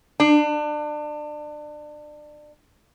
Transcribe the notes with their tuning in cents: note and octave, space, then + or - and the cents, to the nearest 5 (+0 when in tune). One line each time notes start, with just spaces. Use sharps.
D4 +30